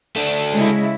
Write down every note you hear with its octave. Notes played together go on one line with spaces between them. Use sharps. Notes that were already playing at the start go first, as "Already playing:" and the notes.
A3 D4
C#3 G#3 E4